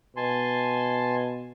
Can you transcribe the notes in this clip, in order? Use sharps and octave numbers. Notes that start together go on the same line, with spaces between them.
B2 G#5 A5 C6